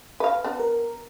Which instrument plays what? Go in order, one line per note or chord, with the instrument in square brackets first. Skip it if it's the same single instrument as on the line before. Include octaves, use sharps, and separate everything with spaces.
[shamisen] B4 F5
B3 D4
[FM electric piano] A#4